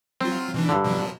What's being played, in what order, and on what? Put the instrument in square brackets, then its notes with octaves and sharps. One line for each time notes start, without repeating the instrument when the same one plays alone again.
[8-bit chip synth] F#3 F4 [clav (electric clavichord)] C4
[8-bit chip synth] B2 E3 D4
[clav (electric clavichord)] G2 D3
[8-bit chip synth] B2 F3 F#3